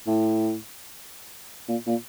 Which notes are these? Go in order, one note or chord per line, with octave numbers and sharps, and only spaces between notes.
A2
A#2
A#2